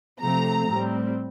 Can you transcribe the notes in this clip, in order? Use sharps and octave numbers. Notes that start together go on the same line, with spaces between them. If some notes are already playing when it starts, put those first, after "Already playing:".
C3 F3 A3 C4 A#5
A2 G3 C4